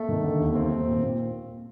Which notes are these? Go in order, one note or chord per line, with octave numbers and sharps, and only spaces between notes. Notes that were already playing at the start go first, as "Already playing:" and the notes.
Already playing: A3 A#3
D#3
D3
D#2
D#2 C4
D#2
A#2
A#2